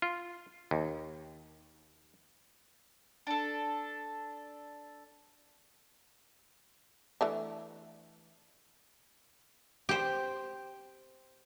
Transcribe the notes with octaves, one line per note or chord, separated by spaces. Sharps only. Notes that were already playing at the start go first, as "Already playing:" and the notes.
F4
D#2
D4 A4
E3 A3 D4
G4 C5